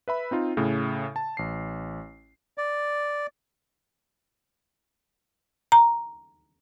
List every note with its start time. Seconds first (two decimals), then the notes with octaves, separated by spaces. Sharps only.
0.08 B4 E5 B5
0.31 C4 D#4 F4
0.57 A2 C#3
1.16 A5
1.37 A1 C7
2.58 D5
5.72 A#5